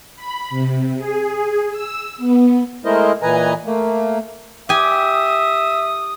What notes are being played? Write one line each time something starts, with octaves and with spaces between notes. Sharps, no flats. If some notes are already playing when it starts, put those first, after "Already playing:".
B5
C3
G#4
E6
B3
G#3 A3 E4 A#4 C5 D#5
A#2 E3 B4 D#5 G#5 A#5
A3 A#3
G4 E5 G#5 D#6